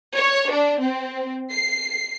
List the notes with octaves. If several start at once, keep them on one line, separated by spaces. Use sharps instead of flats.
C#5
D4
C4
C7